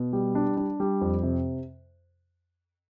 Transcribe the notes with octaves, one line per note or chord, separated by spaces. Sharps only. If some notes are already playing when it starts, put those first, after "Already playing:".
Already playing: B2
G3
D4
D4
G3
F2
C3